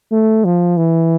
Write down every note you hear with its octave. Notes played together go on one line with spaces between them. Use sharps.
A3
F3
E3